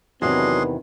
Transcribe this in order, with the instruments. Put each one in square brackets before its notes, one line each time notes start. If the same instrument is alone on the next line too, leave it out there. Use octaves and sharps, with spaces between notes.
[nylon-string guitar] E2 C3 [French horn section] D#3 B3 [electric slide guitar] F#3 [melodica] D4 G#4 C6